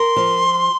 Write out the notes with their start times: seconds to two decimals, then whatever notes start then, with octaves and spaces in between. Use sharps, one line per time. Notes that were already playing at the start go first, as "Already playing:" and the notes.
Already playing: A#4 C6
0.16 F3